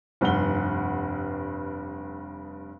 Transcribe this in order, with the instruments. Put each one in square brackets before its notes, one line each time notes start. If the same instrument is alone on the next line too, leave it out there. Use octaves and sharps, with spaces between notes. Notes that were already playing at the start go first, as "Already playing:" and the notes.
[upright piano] F1 G2 F#5 G7